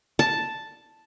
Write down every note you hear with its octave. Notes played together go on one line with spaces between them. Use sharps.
A5